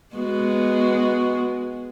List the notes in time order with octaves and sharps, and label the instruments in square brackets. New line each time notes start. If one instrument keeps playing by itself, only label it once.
[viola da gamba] G#3 B3 F#4